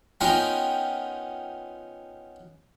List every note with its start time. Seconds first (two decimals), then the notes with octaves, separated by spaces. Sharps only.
0.21 B3 C#4 D#4 F4 A#4 G5